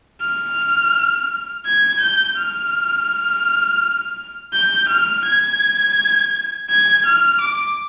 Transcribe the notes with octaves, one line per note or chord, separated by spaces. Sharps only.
F6
G#6
G6
F6
G6
F6
G#6
G#6
F6
D6